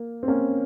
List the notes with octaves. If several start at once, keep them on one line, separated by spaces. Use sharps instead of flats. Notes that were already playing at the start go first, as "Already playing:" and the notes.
Already playing: A#3
C4
A#3 C#4